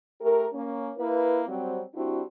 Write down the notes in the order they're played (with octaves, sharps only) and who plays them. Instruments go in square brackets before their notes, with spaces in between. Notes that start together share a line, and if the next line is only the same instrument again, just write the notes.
[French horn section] A3 G4 A#4
A#3 C#4
A#3 E4 B4
F#3 G3 C4
G3 C4 D4 E4 F#4